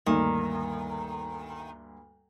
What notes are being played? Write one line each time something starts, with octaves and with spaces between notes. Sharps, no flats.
D2 G2 D#3 A#3